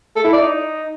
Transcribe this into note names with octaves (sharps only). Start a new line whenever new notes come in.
A4
E4
D5
D#4